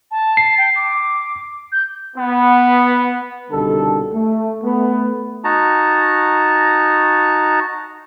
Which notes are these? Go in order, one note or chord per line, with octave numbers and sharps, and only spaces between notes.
A5
C7
G5
D6
G6
B3
C2 B2 D3 D#3 G3 A4
A3
A3 B3
D#4 F#4 A5 A#5